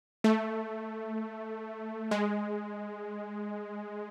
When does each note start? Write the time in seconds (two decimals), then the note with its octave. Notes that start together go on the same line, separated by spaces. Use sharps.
0.24 A3
2.11 G#3